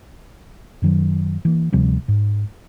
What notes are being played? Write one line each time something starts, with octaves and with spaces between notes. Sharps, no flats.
F#2 D#3 F#3
E3 A#3
D2 C3 F3 G3
G#2